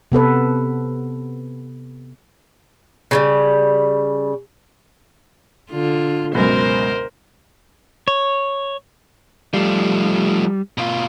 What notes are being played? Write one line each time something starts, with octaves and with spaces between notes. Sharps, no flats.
C3 B3 A4 B4
C#3 F#3 G3
D3 F4
C#2 F#2 B2 A#4 C5
C#5
F3 G3 A3
B2 F4